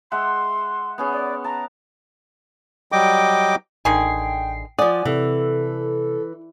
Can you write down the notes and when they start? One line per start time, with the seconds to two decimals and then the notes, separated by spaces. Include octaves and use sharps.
0.12 G#3 E5 F#5 C6
0.98 B3 C#4 G#4
1.12 D5
1.44 A5 A#5
2.92 F#3 G3 D#5 G5 D6
3.85 A1 D3 D#3 G#4 G5 C7
4.79 F3 D5 F#5 G#5 D#6
5.05 C3 E3 A4